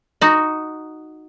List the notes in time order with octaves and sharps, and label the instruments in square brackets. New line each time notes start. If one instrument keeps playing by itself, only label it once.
[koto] D#4 F#4